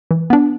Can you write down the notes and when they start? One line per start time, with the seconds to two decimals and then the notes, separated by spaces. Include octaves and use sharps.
0.11 E3
0.30 B3 D4